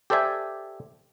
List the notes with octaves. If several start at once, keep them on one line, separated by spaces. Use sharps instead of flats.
G4 A4 C5 D5 E5 G#5